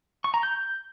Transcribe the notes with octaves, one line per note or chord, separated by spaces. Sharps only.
C#6
A#5
G6